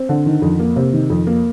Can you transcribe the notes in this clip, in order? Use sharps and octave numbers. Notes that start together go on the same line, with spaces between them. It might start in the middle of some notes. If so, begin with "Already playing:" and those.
Already playing: C4
D3
D#3
F2
A#3
C3
D#3
F2
A#3